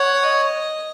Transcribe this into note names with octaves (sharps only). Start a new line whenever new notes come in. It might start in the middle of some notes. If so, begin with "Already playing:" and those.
Already playing: C#5 F#5
D#5